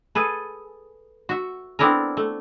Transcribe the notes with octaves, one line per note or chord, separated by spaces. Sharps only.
G#4 A4 B4
F#4 E5
B3 C4 D4 E4 A4 A#4
A3